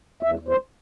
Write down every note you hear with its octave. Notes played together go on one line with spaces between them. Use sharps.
E2 E5
E2
C5